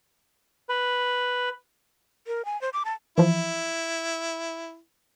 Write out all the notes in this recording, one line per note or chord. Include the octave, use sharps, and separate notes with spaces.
B4
A#4
G#5
C5
D6
A5
E3 F3 E4